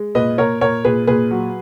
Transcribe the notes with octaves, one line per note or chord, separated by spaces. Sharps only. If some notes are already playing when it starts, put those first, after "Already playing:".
Already playing: G#3
A#2 B4 D#5
A#2 A#4 C#5
A#2 A#4 C#5
A#2 G#4 B4
A#2 G#4 B4
F#3